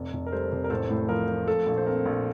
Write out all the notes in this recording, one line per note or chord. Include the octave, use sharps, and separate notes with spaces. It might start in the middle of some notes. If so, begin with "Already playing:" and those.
Already playing: F1
F1
A#4
G3 A4 C5
F1
A#4
A1 A4 C5
A2
F3 A#4
F3
A3 A4
A#1
C5
C4 A#4
A#1